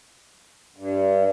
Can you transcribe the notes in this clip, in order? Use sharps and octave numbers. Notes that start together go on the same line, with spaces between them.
G2